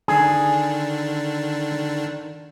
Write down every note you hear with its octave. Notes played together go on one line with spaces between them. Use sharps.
D3 D#3 D4 G#4